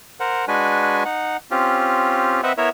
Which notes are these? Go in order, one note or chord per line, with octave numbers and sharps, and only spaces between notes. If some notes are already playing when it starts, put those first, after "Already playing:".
A#4 C5 F#5
G#3 D4 F#4 B4 G#5
D#4 F#5
C4 C#4 F4 G4
C4 B4 C5 D#5 E5 F#5
B3 E4 A#4 C#5 E5